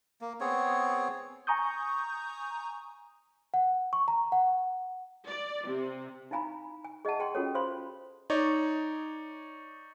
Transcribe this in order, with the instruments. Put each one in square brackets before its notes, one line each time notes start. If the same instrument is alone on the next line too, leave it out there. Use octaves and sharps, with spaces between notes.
[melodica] A#3
B3 C4 G#4 C#5
[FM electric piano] G#5 A#5 C#6 D#6 G6
[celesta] F#5
C#6
A#5
F#5
[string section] D5
C3
[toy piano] D#4 E4 F5 G#5 A#5 B5
G#5
G#4 D#5 E5 F#5 A5
G#4 G5 C6
C#4 F4 F#4 A4 A#4 C#5
C5 C#5 F5 B5 C6
[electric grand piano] D#4 C#5 D5